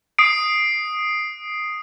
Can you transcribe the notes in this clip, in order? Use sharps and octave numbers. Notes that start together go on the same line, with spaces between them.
D#6 C7 D7